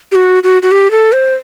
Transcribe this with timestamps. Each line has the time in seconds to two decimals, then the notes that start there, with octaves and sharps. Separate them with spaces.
0.12 G4
0.15 F#4
0.43 F#4
0.63 F#4
0.72 G4
0.91 A4
1.12 C5